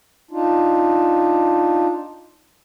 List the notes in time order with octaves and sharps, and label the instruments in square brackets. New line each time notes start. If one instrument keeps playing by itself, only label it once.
[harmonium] D4 D#4 F4